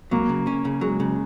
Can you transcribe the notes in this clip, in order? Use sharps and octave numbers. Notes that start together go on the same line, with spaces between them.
F#3 A#3
C#3
C#4
C#3
F#3 G#3
C#3